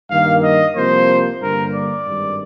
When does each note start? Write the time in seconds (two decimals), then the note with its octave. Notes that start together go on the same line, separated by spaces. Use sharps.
0.11 G2 D#3 A#3 F5
0.44 D#5
0.76 C2 C3 F3 A#3 C5
1.41 G2 D3 G3 A#3 A#4
1.74 D5
2.06 G#1 G2 D#3